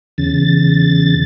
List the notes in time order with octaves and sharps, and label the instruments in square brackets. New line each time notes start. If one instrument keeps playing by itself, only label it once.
[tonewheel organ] E2 C#3 A6